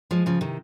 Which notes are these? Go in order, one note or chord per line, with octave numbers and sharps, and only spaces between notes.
F3 G#3
C#3 F3
C3 D#3